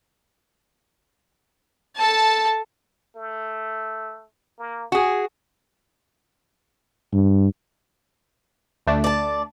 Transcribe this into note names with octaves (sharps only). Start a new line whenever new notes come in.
A4 A5
A3
A#3
F#4 G#4 G#5
G2
D2 A3 D4
D5 A5